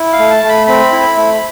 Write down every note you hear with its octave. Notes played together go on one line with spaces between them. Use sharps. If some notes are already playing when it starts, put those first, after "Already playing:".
Already playing: E4
F5
A3
A5
A3
B5
C4 B5
E4
A3